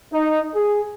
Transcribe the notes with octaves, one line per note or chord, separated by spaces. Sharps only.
D#4
G#4